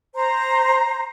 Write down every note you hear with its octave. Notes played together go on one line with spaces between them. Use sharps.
C5 A#5